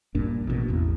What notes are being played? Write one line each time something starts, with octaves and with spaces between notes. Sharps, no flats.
A#1 G2 A#2 D4
A1 B2
A1 E2